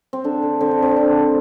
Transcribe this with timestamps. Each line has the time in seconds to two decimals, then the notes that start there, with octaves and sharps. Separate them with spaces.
0.13 C4
0.24 D3 D4
0.43 D3
0.60 D3 C4
0.71 D4
0.79 D3 C4
0.96 D3 D4
1.15 A3